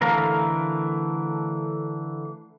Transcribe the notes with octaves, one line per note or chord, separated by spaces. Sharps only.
D3 E3 A3 A#4 F5